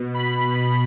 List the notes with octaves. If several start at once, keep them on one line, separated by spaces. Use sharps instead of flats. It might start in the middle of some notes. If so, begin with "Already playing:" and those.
Already playing: B2
B5